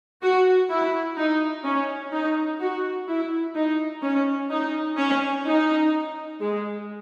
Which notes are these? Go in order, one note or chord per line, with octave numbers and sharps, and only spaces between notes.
F#4
E4
D#4
C#4
D#4
F#4
E4
D#4
C#4
D#4
C#4
D#4
G#3